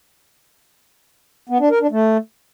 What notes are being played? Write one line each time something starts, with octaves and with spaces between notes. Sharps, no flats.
B3
D4
A#4
D4
A3